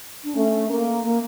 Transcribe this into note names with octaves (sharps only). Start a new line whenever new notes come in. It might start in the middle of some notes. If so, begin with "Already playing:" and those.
D4
A3 C#4
A#3
A#3